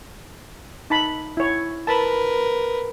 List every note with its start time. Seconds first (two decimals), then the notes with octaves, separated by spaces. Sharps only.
0.90 D#4 A5 B5
1.37 E4 C#5
1.87 A#4 B4 A5 B5